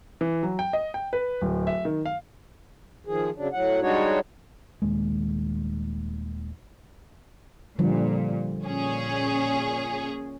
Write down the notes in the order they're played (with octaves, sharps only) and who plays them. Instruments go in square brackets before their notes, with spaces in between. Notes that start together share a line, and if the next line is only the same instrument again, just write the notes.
[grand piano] E3
F#3
G5
D#5
G5
B4
D1
E5
D#3
F5
[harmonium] D#3 F3 G#4
C#3 F#3 D4
A2 F#3 F#5
G3 G#3 D4 D#4 F#4 C#5
[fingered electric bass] D#1 D#2 G#3
[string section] A#2 [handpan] D3 F3 G3
[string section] A#2 C#4 G#4